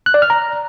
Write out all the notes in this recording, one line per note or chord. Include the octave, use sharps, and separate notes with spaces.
F#6
D5
F6
A#5